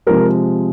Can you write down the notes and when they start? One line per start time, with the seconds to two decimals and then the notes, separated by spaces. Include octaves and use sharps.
0.07 C3 F3 G#3 A#4